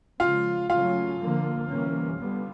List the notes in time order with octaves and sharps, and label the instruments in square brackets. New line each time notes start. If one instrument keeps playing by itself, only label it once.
[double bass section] C#3 F3 G#3 [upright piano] F4 F5
[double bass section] C#3 F#3 A3 C#4 [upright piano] F4 F5
[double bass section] D3 F3 A#3
C3 E3 G3 A#3 C#4
D3 G3 B3